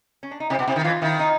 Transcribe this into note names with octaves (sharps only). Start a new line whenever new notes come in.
C#4
D4
D#4
C3 E4
B2
C3 E4
D#3
E3 F4
D#3 E4
D#4